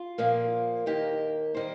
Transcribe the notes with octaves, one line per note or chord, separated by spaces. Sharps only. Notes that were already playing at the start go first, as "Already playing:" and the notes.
Already playing: F4
A#2 F3 A#3
D#2 D#3 A#3 G4
D#3 G3 A#3 C5